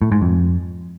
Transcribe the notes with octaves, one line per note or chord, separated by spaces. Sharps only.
A2
G#2
F2